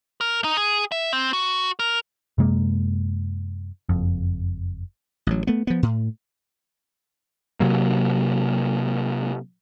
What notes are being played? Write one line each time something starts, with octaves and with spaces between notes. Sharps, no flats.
A#4
D#4
G#4
E5
C4
F#4
A#4
F#2 C3 G#3 A#3
F#1 F2
A1 F#3
A3 B3
F3 B3
A2
C3 F#3 A#3